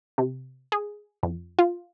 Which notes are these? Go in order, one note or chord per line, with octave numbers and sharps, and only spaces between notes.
C3
G#4
F2
F4